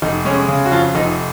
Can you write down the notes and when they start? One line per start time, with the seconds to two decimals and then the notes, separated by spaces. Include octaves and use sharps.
0.02 F1 D#4
0.25 G#3 C#4
0.48 C#3
0.66 F#4
0.72 F2 F4
0.95 F1 D#4